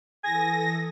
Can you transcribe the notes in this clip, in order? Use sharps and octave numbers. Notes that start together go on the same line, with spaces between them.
E3 A4 G#5 D#6 A#6